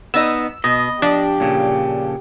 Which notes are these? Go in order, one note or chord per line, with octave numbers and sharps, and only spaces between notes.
B3 D#4 D#5 E6
B2 D#5
F3 D4 G4
A#2 C#3